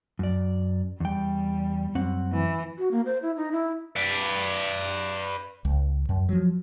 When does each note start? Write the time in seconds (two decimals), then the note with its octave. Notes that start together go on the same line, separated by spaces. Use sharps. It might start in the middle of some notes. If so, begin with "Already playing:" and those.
0.19 F#2 D5
1.00 E2 G3 G5
1.95 F#2 C4 F#5
2.31 E3
2.78 F#4
2.91 A#3
3.06 C5
3.22 E4
3.37 D#4
3.52 E4
3.96 B4 D5
5.65 C#2
6.09 F#2
6.29 F3 F#3